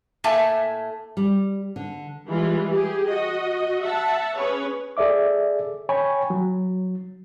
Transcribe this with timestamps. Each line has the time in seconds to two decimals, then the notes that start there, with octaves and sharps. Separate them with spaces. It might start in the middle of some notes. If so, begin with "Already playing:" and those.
0.24 A2 A3 A#3 E5 G#5 A5
1.17 G3
1.76 D3
2.28 E3 G3 G#3 F4
2.70 G4 G#4
3.07 F#4 D#5
3.81 E5 F#5 A5
4.36 C#4 G#4 B4 C#5
4.97 G#4 A4 D5 E5 D6
5.89 C#5 G5 G#5 B5 C#6
6.30 F#3